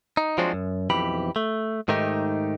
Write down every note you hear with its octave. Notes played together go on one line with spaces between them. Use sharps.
D#4
F3 F#3 G#3 C4 D4 F#4
F#2
B1 F2 E3 G4 B5
A3
G#2 D#3 A3 D#4 G4